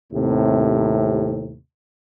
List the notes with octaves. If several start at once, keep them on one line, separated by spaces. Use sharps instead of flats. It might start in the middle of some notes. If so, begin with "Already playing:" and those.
D#2 A2 C3